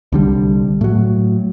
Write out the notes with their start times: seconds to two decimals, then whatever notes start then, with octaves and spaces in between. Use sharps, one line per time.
0.12 C2 D3 G3
0.81 A2 F#3